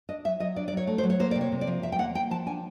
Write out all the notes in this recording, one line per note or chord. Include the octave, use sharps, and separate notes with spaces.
D4 D#5
F#3 E5
F#3 D#5
D4 D5
D5
F#3 C#5
A3
C5
F#3
C#5
A#3 C5
C3 D5
C#5
C3
D5
F3
E2 E5
G5
A#3 F#5
A#3 G5
F3 A5
D4 G#5